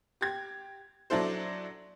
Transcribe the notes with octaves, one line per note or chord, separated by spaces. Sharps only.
G4 G#6
F#3 D4 E4 A4 C5